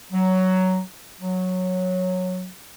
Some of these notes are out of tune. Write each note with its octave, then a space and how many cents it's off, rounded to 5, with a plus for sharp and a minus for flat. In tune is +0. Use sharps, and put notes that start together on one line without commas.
F#3 +10
F#3 -10